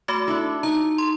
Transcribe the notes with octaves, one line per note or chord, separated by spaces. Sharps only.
A3 F#4 D6
D4 E4 A4
D#4 A#5 C#6
C6